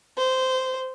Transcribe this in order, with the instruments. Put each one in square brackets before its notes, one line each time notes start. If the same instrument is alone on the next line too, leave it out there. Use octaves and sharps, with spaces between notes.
[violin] C5